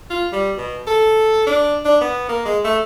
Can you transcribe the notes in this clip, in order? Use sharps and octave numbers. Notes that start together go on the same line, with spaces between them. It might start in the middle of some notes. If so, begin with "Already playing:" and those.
F4
G3
B2
A4
D4
D4
B3
A#3
G#3
A3